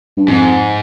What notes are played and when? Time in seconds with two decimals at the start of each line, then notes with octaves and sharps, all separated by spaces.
0.17 G2
0.28 F2 G#2